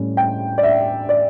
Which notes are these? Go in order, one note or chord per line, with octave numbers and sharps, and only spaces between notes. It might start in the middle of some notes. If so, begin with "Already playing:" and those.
Already playing: A2 G3 C#4
G5
D5
E5
D5